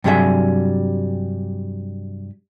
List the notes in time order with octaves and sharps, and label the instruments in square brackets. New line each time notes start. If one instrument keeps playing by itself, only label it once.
[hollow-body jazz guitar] G2 C3 F#3 G3 G#4 E5